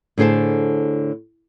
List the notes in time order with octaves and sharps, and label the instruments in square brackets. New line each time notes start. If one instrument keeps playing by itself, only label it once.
[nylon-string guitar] A2 D3 G#4 C5 A5